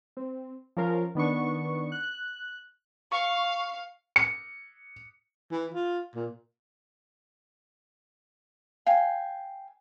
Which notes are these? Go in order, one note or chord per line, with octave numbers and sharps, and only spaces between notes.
C4
F3 C#4 A#4 F5
D#3 B3 D4 C#6
F#6
F5 C#6
C#7
E3
F4
A#2
F5 G5 G#5